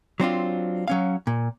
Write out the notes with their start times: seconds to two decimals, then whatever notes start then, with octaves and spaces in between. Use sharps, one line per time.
0.20 F#3 C4 D4 F4
0.88 F#3 C#4 F5
1.27 A#2